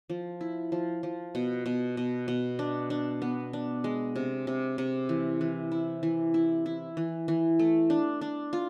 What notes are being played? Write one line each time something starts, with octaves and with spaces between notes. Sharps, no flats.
F3
E4
F3
F3
B2
B2
B2
B2
D4
D4
B3
D4
G#3
C3
C3
C3
E3
E3
E4
E3
E4
E4
E3
E3
A3
D4
D4
F4